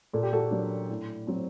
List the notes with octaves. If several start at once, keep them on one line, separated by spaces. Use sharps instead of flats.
A#2 A4
G4
F#4 A4
F#3 A#3 D4
A2
F#3 C4